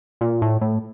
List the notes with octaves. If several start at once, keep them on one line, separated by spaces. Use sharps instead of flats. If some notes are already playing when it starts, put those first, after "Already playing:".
A#2
A2
A2